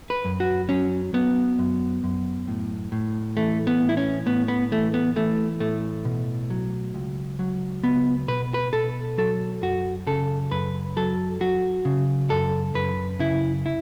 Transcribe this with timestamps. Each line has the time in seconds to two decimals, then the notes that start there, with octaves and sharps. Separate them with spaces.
0.10 B4
0.25 F#2
0.40 F#4
0.69 F#3 C#4
1.14 F#3 B3
1.59 F#2
2.04 F#2
2.48 A2
2.92 A2
3.37 E3 A3
3.67 B3
3.82 A2
3.89 E4
3.97 C#4
4.26 A2 B3
4.48 B3
4.72 E3 A3
4.94 B3
5.16 E3 A3
5.60 A2 A3
6.05 B2
6.50 F#3
6.94 C#2
7.39 F#3
7.84 C#2 B3
8.28 B2 B4
8.54 B4
8.73 B2 A4
9.18 F#3 A4
9.62 F#2 F#4
10.07 C#3 A4
10.51 F#2 B4
10.97 F#3 A4
11.41 F#3 F#4
11.85 C#3
12.30 F#2 A4
12.74 F#2 B4
13.19 C#3 E4
13.66 E4